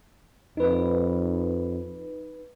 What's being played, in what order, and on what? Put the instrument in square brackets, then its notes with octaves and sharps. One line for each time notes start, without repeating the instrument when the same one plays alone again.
[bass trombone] F2 [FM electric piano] D#4 B4